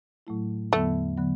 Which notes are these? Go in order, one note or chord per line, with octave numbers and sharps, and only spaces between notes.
A2 F#3 A3 E4
E2 D3 F#3 A3 B3
D3 F#3 B3